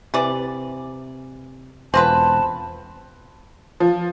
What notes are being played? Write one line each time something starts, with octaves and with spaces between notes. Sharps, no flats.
C3 E3 D5
E1 C4 F4 B4 A5
F3